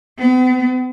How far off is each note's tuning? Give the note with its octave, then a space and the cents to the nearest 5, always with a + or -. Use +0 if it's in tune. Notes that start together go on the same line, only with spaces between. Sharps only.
B3 +45